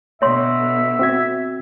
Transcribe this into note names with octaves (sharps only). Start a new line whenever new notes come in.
B2 D3 C#5 E5 C6
C4 F#4 G#6